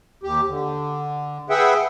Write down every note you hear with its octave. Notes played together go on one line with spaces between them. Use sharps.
D#2 G4
D3
G#4 B4 E5 F#5 G5